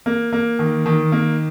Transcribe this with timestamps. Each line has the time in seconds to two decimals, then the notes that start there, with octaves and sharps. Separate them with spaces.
0.06 A#3
0.33 A#3
0.59 D#3
0.86 D#3
1.12 A#3